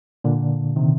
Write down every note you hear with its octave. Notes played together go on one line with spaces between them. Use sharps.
A#2 D3
C3 D#3